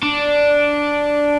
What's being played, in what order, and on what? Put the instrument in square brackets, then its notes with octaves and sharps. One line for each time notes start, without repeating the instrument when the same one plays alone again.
[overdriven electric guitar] D4